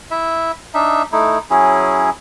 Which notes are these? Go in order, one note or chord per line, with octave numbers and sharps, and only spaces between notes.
E4 E5
D4 D#4 E5
A3 D#4 E4
F#3 C#4 E4 G#4